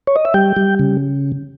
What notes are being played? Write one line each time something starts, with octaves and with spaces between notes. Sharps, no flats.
C#5
D#5
E5
G3 G5
G3
C#3